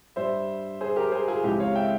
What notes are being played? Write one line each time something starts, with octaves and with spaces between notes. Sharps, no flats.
G2 G3 C5 E5
G#4 C5
G4 A#4
G#4 C5
F4 G#4
C#2 C3 F3 E4 G4
C#5 F5
E5 G5